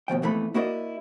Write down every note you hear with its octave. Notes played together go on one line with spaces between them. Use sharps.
D#2 B2 F3 G5
F2 A#2 E3 A3 B3 B5
A#3 E4 F#4 A#4 D5 D#5